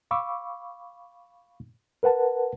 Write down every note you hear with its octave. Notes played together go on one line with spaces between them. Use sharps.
F5 B5 C#6 D6 E6
A#4 B4 F#5 A5